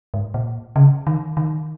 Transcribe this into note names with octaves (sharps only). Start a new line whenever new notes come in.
G#2
A#2
C#3
D#3
D#3